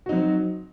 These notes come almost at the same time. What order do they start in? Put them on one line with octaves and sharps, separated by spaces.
F#4 D#4 F#3 C4